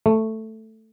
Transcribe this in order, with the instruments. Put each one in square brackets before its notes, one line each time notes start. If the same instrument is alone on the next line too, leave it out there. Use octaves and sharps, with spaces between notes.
[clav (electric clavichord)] A3